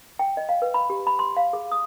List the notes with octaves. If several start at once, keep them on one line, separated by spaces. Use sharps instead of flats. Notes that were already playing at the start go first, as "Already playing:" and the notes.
G5
D#5
F5
B4
B5
G4
B5
C6
F5
G#4
D#6